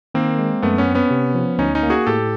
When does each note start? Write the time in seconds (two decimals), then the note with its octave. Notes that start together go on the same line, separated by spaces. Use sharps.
0.14 D#3 A#3 C4
0.38 G#3
0.62 F#2 A3 B3
0.78 B3 C#4
0.86 C4
0.94 B3 C#4
1.11 C3
1.35 F3
1.58 D2 C#4 D#4
1.75 C#4 D#4
1.83 A#3
1.90 F#4 G#4
2.07 A2 G4 A4